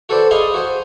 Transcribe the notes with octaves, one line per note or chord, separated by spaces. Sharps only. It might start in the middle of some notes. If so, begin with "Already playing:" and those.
F#4 A4 B4 C5 D5
G#4 D#5 F5 G#5 B5 C6
F#4 C5